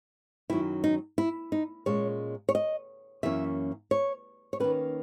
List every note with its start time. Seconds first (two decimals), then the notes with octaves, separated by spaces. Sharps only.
0.50 F#2 D#3 F#3 C#4 E4
0.84 D#4
1.18 E4
1.52 D#4
1.86 A#2 G#3 C#4 C#5
2.49 C#5
2.55 D#5
3.23 F#2 E3 A#3 C#4 E5
3.91 C#5
4.53 C#5
4.60 D#3 A#3 C#4 B4